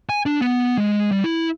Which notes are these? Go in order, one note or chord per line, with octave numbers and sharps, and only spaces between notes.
G#5
D4
B3
G#3
G3
E4